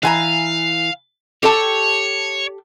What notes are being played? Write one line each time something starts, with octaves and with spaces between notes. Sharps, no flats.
E3 F5 G#5 A#5
G4 A4 C#5 A5